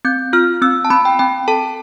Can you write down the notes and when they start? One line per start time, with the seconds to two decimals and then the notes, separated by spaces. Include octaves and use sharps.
0.05 C4 G6
0.33 F4 F6
0.62 C4 E6
0.85 A5
0.90 C4 B5
1.05 G5
1.19 C4 G5
1.48 A4 A5